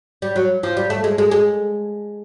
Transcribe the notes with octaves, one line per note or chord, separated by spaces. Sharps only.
G3
F#3
F3
G3
A3
G#3
G#3
G#3